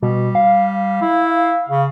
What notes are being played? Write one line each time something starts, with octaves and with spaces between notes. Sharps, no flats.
B2 G3
F5
E4
C#3